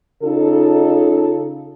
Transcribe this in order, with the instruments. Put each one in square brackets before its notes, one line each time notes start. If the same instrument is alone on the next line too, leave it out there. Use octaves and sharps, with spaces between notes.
[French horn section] C#3 D#4 F4 A4